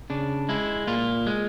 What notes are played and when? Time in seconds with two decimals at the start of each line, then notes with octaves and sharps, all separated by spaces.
0.10 C#3 D4
0.49 G#3 E4
0.87 A#2 F4
1.27 G#3